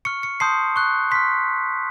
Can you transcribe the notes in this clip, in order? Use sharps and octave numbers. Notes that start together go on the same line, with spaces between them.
C#6 F6 C#7
C#7
A5 C6 D#6 G6 C7
C#6 F#6
C6 F6 B6